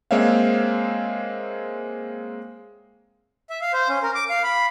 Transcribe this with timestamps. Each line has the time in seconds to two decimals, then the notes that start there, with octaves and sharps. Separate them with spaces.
0.11 G#3 A#3 C4 C#5 E5 F5
3.50 E5
3.61 F5
3.73 C5
3.89 C#4
4.03 A#4
4.15 D6
4.30 F5
4.44 B5